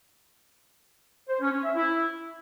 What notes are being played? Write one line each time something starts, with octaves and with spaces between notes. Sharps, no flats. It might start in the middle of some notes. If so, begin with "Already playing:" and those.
C5
C#4
C#4
E5
E4